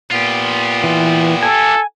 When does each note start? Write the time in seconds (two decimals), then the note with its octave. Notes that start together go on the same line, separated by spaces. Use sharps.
0.12 A#2 B3 F4 G4
0.84 E3
1.43 A4 G#5